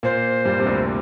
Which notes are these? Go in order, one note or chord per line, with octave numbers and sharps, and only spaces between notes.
A#2 A#3 C5
G2 G3
C3
D2 D3